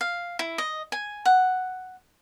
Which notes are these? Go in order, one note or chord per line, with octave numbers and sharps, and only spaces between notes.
F5
E4
D#5
G#5
F#5